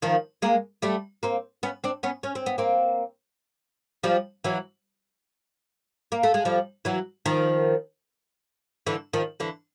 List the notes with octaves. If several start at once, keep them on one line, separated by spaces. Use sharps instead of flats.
D#3 F3
G#3 A#3
G3 A3
A#3 C4
B3 C#4
C4 D4
B3 C#4
C#4
C4
B3
A#3 C4
F3 G3
E3 F#3
A#3
A3
G#3
F3 G3
E3 F#3
D#3 F3
D3 E3
D#3 F3
D3 E3